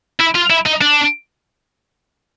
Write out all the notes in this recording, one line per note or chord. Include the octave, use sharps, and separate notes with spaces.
E4
F4
E4
D#4
D4